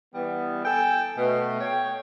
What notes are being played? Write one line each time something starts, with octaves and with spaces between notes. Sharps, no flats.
E3 G3 B3
A4 G5 G#5
B2 A3
C#5 G5